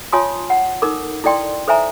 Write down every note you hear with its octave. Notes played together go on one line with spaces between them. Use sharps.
F4 C#5 G#5 A5 C6 D#6
F#5
D#4 A4 A#4 D6
E4 A4 D5 G5 C6
A4 C5 E5 G#5 A#5